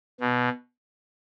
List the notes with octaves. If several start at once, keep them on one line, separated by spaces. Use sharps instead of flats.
B2